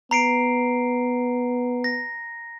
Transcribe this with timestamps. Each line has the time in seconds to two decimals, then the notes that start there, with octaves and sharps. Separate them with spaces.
0.11 B3 A#5 C7 D7
1.84 A#6